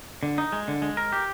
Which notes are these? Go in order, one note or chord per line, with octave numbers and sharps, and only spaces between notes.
D3
D#4
G#3
D3
G#3
A#4
G4